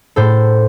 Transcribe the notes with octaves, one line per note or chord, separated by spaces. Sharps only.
A2 A4 C5